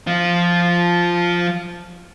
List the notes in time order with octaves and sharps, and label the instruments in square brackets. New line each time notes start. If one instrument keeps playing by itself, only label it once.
[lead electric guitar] F3 F4